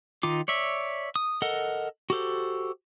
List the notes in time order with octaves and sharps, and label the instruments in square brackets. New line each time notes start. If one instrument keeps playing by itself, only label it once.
[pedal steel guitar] D#3 D#4 F4 D6
C#5 D5 E5
D#6
A4 A#4 D#5 F#5
F#4 G4 A4 C5